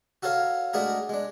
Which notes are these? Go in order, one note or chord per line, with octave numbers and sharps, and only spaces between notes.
F#4 A4 A#4 C#5 F5
G#3 A3 D4 F#4 G#4 A#4
G#3 D4